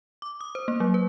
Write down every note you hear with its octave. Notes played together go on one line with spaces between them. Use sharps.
D6
D#6
C5
A#3
F#3
B4